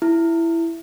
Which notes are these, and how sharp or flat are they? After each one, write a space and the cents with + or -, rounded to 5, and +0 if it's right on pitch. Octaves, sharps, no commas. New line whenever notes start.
E4 +10